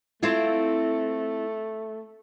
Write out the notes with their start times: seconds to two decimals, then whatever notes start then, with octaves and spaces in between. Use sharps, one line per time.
0.23 A3 C4 E4 F4